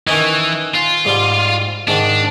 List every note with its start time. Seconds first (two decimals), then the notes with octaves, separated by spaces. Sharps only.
0.07 D#3 E3 C#4 D#4
0.74 F4
1.05 G#2 G3
1.88 G#2 D#3 D4